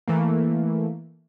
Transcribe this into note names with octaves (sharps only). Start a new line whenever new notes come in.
E3 A3 A#3